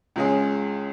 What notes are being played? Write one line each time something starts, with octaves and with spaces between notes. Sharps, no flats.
C#2 C#3 G#3 C#4 G#4